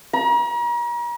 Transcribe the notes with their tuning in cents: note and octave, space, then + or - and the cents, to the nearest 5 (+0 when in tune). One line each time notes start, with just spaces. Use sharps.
A#5 +40